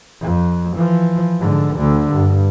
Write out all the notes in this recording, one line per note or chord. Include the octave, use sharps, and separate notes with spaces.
F2
E3 F3
G#2 D3
D2 D3
G2